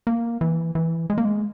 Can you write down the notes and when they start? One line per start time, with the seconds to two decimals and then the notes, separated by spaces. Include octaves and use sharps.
0.07 A#3
0.41 E3
0.75 E3
1.10 G#3
1.18 A#3
1.25 G#3